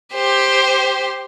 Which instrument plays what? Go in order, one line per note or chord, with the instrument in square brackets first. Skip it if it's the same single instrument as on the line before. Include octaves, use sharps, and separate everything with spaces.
[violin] G4 C5